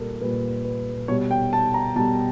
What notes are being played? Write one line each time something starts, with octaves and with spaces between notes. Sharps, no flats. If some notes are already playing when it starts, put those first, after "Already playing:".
Already playing: A#2 G3 A4 A#4
A#2 G3 B4
B4
B2 G3 C#5
G5
A5
A#5
B2 G3 A5